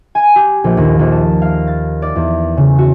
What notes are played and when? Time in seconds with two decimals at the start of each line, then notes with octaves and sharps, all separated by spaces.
0.15 G#5
0.36 G4
0.64 A#1
0.77 D#2
0.99 A#1
1.12 A5
1.42 F5
1.68 A6
2.02 D5
2.16 E2
2.57 C#3
2.78 F#4